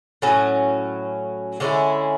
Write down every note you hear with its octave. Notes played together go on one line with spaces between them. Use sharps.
A2 F#3 C#4
D3 G#3 C#4 E4